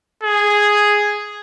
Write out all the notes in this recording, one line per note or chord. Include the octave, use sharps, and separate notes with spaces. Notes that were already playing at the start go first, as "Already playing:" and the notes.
G#4